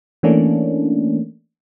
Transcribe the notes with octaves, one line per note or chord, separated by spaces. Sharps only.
E3 A3 A#3 C#4 D4